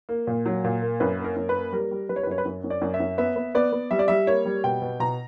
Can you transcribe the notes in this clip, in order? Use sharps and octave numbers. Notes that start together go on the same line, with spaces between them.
A#3
A#2
F#3
A#2
A#3
F#2 B4
A#3
A#4
F#2
B4
A#3
G3 A#4
G3
G3 B4
C#5
B4
F#2 C#5
B4
F#2
F#2
D5
F#2
E5
F#2
B3 E5
B3
B3 D5
B3
G3 E5
D5
G3 E5
A#3 C#5
G3
B2 G5
B2
B2 A#5